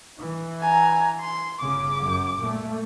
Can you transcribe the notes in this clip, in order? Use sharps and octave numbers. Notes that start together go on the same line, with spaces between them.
E3
G#5 A#5
C6
G1 C#3 D6
F#2
A#2 A3